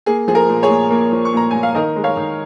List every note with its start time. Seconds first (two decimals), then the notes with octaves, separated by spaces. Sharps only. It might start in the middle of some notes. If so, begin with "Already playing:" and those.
0.06 A#3 G#4
0.28 F3 G#4
0.35 A#4
0.49 A#2
0.63 G#4 C#5
0.70 A#2
0.91 A#3
1.12 F3
1.25 C#6
1.33 A#2 A#5
1.51 A#2 G#5
1.63 F5
1.75 D#3 A#4 D#5
1.96 G#3
2.04 C#5 F5
2.17 D#3